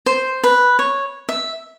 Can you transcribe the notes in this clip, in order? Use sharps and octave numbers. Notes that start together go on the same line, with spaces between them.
C5
B4
C#5
E5